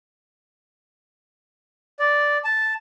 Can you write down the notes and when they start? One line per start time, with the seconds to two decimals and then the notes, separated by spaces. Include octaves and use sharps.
1.99 D5
2.45 A5